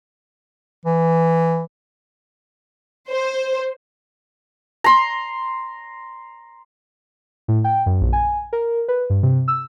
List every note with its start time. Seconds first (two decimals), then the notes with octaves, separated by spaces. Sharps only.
0.85 E3
3.10 C5
4.84 A#5 C6
7.48 A2
7.64 G5
7.86 F#2
8.01 A#1
8.13 G#5
8.53 A#4
8.88 B4
9.10 G2
9.23 C3
9.48 E6